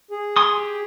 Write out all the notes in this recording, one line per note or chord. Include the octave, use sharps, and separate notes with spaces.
G#4
G#5 C6 D#6
G4